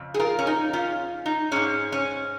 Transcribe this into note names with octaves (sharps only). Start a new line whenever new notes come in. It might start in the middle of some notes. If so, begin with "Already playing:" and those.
Already playing: F2 C#3
G#4
F4 A#4
C#4
D#4
C#4 F4
D#4
G#2 G#3 C#4
C#4